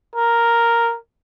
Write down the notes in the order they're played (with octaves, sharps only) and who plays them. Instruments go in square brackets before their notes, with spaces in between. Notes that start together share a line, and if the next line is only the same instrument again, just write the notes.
[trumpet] A#4